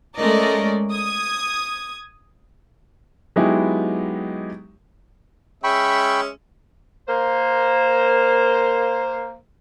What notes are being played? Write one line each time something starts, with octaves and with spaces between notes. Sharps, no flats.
G#3 A3 C#4 A#4 D5 D#5
D#6 G#6
F#3 G#3 B3 D#4 E4 G4
G#3 C#4 E5 G5 B5 C#6
A#3 C5